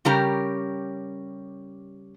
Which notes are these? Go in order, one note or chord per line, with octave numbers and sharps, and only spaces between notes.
C#3 G3 C#4 G4 A#4 A#5